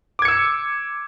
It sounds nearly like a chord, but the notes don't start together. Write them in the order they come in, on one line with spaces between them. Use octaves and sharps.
D6 G#6 C#7 E6